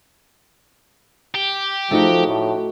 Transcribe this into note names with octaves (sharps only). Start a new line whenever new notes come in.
G4
F3 A3 D#4 F#4
A2